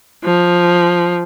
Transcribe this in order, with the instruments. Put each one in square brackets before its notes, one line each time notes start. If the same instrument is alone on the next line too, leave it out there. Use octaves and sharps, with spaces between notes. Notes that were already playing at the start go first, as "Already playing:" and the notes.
[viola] F3